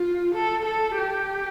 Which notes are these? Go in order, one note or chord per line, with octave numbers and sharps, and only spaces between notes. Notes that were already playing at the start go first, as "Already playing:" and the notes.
Already playing: F4
A4
A4
G4